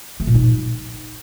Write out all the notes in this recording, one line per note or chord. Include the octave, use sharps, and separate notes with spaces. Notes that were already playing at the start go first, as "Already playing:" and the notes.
A3
A#2
D#4